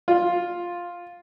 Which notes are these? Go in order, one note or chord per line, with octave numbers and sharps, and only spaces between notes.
F4